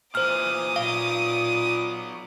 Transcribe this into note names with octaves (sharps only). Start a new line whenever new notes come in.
A#2 E3 C5 D6 D#6 F6
A#2 F#3 B3 F5